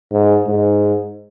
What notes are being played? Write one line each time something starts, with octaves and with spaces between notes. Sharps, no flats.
G#2
G#2